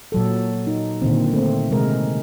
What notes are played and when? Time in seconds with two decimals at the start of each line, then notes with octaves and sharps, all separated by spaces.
0.12 A#2 F#3 A4
0.67 D#4
1.02 A#2 D3 D#3 C4
1.33 A3 C4
1.71 C3 D#3 G#3 A#4